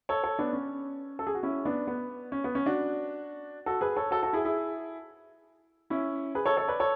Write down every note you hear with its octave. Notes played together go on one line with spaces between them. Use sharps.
A4 C#5
A4 C#5
B3 D4
C#4
A4
G#4
F#4
C#4 E4
B3 D4
B3
C#4
B3
C#4
D4 F#4
F#4 A4
G#4 B4
A4 C#5
F#4 A4
F#4 A4
E4 G#4
E4 G#4
C#4 E4
G#4 B4
A4 C#5
A4 C#5
B4 D5
A4 C#5